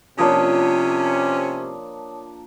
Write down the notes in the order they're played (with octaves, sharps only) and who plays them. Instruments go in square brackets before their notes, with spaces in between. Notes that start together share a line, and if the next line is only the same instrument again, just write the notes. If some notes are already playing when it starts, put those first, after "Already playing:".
[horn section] C3 C#4 [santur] F3 A#3 D4 [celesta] C#5 A5 D#6